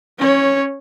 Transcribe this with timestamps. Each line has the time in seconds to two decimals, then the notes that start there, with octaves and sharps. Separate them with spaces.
0.18 C#4 C#5